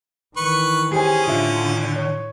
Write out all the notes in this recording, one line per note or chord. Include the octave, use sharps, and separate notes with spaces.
D#3 E3 B4 C#6
C#4 G4 G#4 C5 G#5
A2 D3 F4 E5
C#5